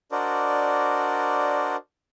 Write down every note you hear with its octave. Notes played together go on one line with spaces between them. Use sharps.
D4 F#4 A#4 C5 D5 D#5